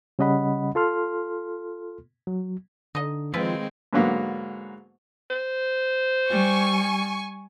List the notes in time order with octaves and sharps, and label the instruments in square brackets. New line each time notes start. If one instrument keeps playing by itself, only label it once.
[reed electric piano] C#3 G3 C#4 D#5 F#5 B5
F4 A4 C6 F6
F#3
[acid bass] D3 [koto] D#4 D#5
[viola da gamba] D#3 G#3 C4 [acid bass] F3 [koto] E4 F4 B4
[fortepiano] G#2 D3 F#3 A#3 B3
[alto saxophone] C5
[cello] G3 [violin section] G#5 C#6